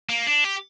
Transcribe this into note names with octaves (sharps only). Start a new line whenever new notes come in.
A#3
D4
G4